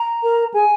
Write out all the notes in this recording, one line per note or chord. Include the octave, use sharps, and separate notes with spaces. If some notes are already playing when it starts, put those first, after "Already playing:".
Already playing: A#5
A#4
G#4 G#5